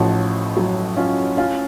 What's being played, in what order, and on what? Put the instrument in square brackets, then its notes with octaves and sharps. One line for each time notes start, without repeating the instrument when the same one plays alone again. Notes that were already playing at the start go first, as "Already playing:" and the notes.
Already playing: [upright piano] A1 A2 F3 [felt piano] D#4 F#4
[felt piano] F#3
C#4 F4
C#4 F4